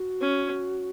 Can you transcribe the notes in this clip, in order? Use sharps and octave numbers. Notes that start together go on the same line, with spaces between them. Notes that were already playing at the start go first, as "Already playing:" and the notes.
Already playing: F#4
C#4